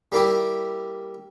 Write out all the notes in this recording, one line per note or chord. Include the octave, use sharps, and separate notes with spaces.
G3 A#3 E4 G4